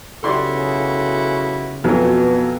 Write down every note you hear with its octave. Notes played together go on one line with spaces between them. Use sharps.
B1 C#3 E4 F#4 G4 A4 D5 C6
F2 B2 E3 F#3